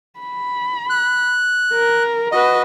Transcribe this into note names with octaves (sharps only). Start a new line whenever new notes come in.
B5
F#6
A#4
F#4 B4 D#5